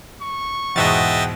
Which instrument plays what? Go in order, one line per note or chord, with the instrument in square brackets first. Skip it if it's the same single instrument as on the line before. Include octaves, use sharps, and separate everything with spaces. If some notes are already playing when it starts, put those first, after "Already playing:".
[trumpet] C#6
[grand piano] E2 G#2 B2 [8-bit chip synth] D#5 E5 A6 [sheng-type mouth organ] F#5 G5